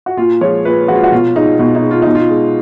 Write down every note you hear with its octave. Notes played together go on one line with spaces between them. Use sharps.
F#4
A#2 F4
F3 G#3 C#5
A#2 B4
F3 G#3 F#4
F4
F#4
B2 F4
G#3 D#4
B2 F4
D#4
G#3
F4
B2 D#4
F4
G#3